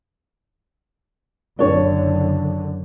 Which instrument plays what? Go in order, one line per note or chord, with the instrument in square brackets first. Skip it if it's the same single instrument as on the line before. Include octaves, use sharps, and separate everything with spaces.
[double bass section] F#1 F#2 D3 [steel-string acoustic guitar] D4 C#5